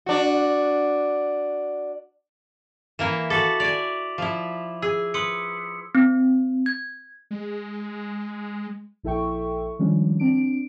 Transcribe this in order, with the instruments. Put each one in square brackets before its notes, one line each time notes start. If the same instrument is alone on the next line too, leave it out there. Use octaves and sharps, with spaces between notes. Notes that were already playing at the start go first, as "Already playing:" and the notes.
[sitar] D4 F#4
[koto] E3 A#3 E4 [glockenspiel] E7
[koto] F#4 A4 [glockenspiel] D6 B6 F#7
[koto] D5 G#5 [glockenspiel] F7
[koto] F3 E4
[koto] G#4 [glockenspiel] E6
[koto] B4 [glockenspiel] C6 D#6 C#7
[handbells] C4
G#6
[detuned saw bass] G#3
[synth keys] A#1 E4 A4 E5 G5 C#6
D#3 F3 G3 G#3 C#4 D4
C4 D4 D7